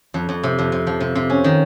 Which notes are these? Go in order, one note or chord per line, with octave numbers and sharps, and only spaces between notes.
F2
F2
C3
F2
C3
F3
C3
C3
C#4
D#3